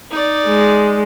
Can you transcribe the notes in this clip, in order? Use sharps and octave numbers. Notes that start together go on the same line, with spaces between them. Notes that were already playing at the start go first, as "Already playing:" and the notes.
D#4 D5
G#3